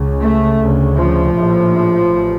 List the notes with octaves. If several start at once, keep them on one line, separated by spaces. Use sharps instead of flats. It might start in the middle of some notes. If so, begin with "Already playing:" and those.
Already playing: C#2 C#3
A3
D2 C#3
F3
A#1 A2
A1